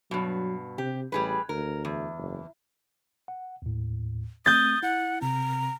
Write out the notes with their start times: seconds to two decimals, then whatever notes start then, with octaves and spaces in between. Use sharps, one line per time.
0.11 G2 B2 F#3
0.78 C3 G4
1.12 A1 G3 G#4 B4
1.49 D2 A#4
1.85 E2
2.18 F#1
3.28 F#5
3.62 D#2 A2
4.46 A3 C4 D#6 G6 A6
4.83 E4 F#5
5.21 C3 C4 A#5